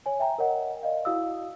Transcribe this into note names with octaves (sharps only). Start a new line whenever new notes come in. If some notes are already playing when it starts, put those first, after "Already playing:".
C#5 G#5
E5 G5 A#5
A#4 C#5 D#5 F#5
D5 D#5 F5
E4 F#4 F5 D#6 E6